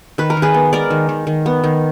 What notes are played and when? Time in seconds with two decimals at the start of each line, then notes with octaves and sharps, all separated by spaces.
0.18 D#3 B4
0.30 A#4
0.37 D#3
0.42 G#4 B4
0.54 B3
0.73 G#3 A#4 D5
0.90 D#3
1.09 D#3
1.27 D#3
1.46 B3
1.64 D#3